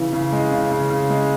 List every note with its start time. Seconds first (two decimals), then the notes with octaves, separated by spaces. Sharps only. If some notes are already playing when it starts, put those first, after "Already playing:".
Already playing: C#3 E3
0.13 C#3
0.33 G#3
0.52 C#3
0.72 C#3
0.90 C#3
1.10 G#3